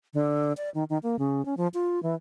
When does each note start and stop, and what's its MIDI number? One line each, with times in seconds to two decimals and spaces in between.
0.14 0.53 50
0.57 0.70 74
0.74 0.84 51
0.90 0.98 51
1.03 1.16 58
1.19 1.44 49
1.45 1.54 61
1.57 1.67 53
1.74 2.02 65
2.03 2.14 52